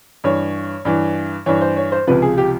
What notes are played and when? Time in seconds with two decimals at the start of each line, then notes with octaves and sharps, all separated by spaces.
0.24 G2 E3 C#5
0.85 G2 E3
1.46 G2 E3 C#5
1.61 C5
1.76 C#5
1.92 C5
2.07 C#2 C3 F3 B4
2.22 G#4
2.38 G4